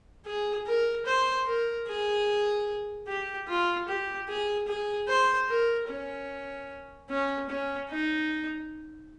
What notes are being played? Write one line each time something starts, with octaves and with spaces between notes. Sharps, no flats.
G#4
A#4
C5
A#4
G#4
G4
F4
G4
G#4
G#4
C5
A#4
C#4
C#4
C#4
D#4